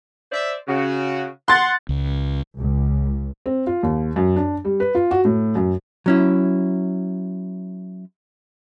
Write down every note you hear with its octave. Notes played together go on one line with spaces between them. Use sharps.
C5 D5 E5
C#3 F#4
F#5 C6 A6
C#2
C#2
C4
F4
D#2
F#2
D4
G3
B4
F4
F#4
A2
F#2
F#3 C#4 E4